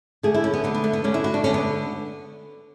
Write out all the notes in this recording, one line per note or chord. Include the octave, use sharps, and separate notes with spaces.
D3 A3 G#4
E4
C#4
B3
D3 A3 B3
B3
A3
B3
D3 A3 C#4
E4
F#4
D4
D3 A3 C#4
B3